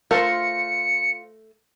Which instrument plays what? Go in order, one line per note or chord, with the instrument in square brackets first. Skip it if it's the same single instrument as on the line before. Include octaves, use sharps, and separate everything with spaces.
[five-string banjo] A3 A#4 [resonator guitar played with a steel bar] F4 C5 [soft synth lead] C#7